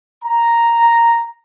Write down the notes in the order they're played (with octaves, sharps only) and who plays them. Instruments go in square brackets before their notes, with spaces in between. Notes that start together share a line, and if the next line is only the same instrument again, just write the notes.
[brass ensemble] A#5